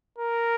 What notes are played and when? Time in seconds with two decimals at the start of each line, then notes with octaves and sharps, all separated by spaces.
0.18 A#4